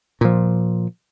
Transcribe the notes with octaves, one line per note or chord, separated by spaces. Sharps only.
A#2 F3